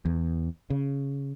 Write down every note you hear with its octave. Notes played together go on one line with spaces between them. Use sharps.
E2
C#3